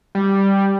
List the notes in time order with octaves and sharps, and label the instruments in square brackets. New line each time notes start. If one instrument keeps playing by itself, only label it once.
[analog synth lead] G3